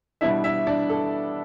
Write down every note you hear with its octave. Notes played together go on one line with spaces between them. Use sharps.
B2 G3 B3 D4 E4 E5
E4 E5
D4 D5
A4